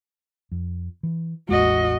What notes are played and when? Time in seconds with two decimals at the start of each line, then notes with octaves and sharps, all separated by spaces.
0.52 F2
1.03 E3
1.49 A1 E2 G#3 F#4 D#5